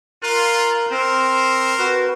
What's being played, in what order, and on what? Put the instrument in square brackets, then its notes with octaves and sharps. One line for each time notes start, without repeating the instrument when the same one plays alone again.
[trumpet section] F4 [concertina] A#4 F#6
[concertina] C4 [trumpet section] A#4 C5
[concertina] F#4 B4